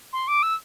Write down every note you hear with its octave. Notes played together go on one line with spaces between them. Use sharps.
C6
D6
E6